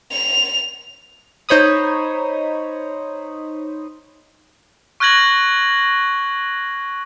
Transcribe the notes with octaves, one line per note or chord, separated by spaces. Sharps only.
F7
D#4 C5 C#5 B5 D#6
C#6 F6 F#6 G#6 A#6 F#7